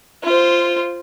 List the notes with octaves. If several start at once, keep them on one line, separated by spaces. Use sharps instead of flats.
F4 C5